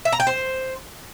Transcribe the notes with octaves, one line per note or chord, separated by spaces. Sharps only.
E5
A#5
G5
C5